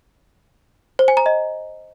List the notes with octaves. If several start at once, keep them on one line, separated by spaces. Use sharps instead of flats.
C5
G#5
A#5
D#5